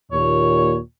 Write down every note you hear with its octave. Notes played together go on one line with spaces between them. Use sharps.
D#2 A#2 C#5